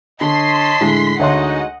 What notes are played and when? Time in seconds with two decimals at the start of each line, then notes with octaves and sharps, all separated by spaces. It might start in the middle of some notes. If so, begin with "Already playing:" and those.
0.21 D3 C#5 D#5 A5 C6 B6 C7
0.80 A2 D3 G#3
1.19 D2 G#3 D#4 F#4 C#5 D#5 F#5 C6